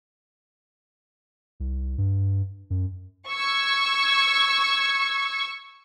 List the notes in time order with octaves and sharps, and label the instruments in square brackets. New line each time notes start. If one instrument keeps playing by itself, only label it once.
[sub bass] C2
G2
F#2
[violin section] C#6 E6 G#6